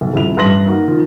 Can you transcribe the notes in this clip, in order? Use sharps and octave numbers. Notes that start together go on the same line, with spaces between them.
B1
D#1 F2 E4 F7
A1 G2 B4 C6 A#6 F#7
A#3 D#4 F#4
D#3 F3